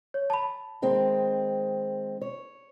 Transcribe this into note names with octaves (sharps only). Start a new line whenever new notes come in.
C#5
A5 B5
D#3 G#3 C4
C#5